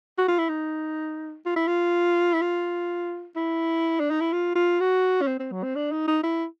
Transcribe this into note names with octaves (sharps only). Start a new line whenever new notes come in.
F#4
F4
E4
D#4
F4
E4
F4
E4
F4
E4
D4
D#4
E4
F4
F4
F#4
C#4
C4
C4
F#3
C4
D4
D#4
D#4
E4